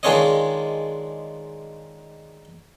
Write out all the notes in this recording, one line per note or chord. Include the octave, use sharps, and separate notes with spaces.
D#3 G#3 D4 F4 C#5 D#5